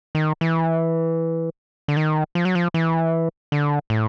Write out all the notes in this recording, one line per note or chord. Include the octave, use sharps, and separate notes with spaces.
D#3
E3
D3
D#3
F3
F#3
F3
E3
D3
A2